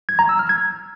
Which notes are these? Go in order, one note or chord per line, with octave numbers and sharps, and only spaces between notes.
G#6
A#5
E6
F6
G#6